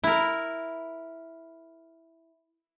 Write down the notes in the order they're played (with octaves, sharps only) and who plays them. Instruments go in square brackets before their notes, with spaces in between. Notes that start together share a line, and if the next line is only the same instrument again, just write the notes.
[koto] E4 A#4